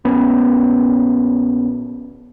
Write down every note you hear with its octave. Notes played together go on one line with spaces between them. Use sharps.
A#1 B3 C#4